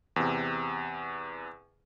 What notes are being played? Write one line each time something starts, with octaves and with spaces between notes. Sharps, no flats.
E2 C3